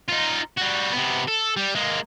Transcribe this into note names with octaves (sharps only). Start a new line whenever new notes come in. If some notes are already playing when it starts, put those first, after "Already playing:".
D#4 F4
G3 F#4
C3 B3
A4
G3
G#3 A#3